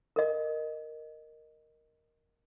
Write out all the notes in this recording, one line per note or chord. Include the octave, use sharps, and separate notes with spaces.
A#4 D#5